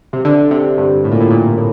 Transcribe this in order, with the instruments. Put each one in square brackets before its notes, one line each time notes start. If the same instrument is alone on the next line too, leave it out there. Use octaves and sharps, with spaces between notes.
[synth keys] C3
D3
C3
G2
A2
A#2
A2
A#2
A2